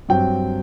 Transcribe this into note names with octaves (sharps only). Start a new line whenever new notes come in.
G2 F#3 C4 G5